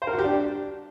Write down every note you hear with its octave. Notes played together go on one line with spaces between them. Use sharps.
C5
A#4
F#4
G4
D4